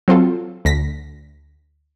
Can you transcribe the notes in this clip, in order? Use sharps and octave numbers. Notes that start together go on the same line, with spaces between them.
F#3 C4 F4 A4
D2 A#6 B6